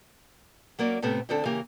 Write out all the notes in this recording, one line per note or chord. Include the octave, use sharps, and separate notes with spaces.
F#3 A#3 C#4 D5
A2 C3 A3 B3 C4
D2 D3 C4 D4 A4
C#3 E3 A#3 G4 A#4